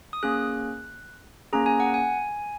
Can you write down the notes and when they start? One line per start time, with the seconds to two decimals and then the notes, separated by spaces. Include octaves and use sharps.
0.13 D#6
0.23 A#3 C#4 G#4 F#6
1.53 A#3 C#4 G#4 A#5
1.66 G#5
1.80 F#5
1.94 G#5